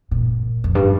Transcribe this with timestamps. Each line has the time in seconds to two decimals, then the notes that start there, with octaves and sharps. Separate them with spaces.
0.11 A#2
0.64 F2
0.75 G2